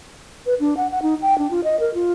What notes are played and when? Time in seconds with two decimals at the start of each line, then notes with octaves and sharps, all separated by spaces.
0.46 B4
0.60 D4
0.77 F#5
0.91 F#5
1.02 D#4
1.22 G5
1.38 D4
1.51 F4
1.64 D#5
1.80 A#4
1.94 F4